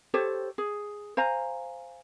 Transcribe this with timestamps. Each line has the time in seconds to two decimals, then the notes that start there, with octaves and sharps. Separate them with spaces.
0.14 G4 A4 C5 C#5
0.58 G#4
1.17 C5 F5 G#5 A#5